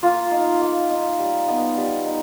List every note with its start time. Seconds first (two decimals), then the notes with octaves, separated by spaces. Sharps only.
0.03 A#3 F4
0.31 D#4
0.61 A#3
0.90 D#4
1.19 G3
1.48 B3 D#4
1.77 G3
2.06 D#4